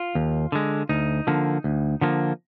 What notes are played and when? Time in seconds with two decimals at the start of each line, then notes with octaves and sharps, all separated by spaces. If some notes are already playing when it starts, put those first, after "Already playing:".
Already playing: F4
0.15 D#2
0.52 D3 G#3
0.89 D2 D#4
1.27 D3 F3 A#3
1.64 D2
2.01 D3 F3 A#3